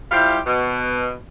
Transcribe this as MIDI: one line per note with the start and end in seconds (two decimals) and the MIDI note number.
0.11 0.38 55
0.11 0.38 64
0.11 0.38 65
0.11 0.38 67
0.11 0.38 72
0.46 1.13 47